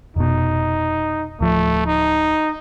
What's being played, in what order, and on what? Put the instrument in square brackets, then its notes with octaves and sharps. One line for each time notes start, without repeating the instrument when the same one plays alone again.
[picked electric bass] F1 B2 [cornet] D#4
[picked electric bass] D1 F3 [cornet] A3
[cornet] D#4